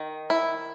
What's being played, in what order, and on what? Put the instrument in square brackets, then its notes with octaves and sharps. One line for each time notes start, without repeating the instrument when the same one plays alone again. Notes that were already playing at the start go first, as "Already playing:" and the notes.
Already playing: [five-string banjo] D#3
E4